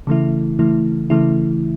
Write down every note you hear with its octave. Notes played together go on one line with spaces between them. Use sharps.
C#3 E3 A3 E4
C#3 E3 A3 E4
C#3 E3 A3 E4